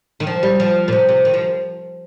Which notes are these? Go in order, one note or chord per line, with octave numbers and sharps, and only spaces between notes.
D#3
F3
G3
F3
A#2
C3
C3
D#3
F3